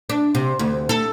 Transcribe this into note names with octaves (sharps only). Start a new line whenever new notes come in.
D4
C3
D2
A4